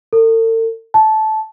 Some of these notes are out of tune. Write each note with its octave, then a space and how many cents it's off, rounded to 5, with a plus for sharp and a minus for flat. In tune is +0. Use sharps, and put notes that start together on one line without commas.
A4 +45
A5 -15